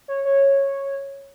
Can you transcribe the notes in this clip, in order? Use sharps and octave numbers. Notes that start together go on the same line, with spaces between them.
C#5
C#5